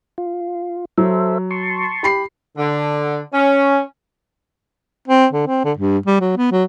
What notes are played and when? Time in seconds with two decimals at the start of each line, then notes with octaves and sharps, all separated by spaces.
0.18 F4
0.98 F#3 A4 C5 E5
1.51 A5 C6 C#6
2.03 G4 B5 C7
2.58 D3
3.34 C#4
5.08 C4
5.33 D3
5.47 C4
5.64 D3
5.77 G2
6.06 G3
6.21 F#3
6.37 B3
6.52 F#3